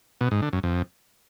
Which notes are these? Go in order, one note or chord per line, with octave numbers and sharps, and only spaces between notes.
B2
G#2
D3
F#2
F2